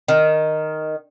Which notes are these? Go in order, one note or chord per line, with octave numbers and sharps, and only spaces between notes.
D#3